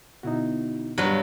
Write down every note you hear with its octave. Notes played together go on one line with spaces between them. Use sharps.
B2 D3 D#4 E4 F#4
G2 F#3 B4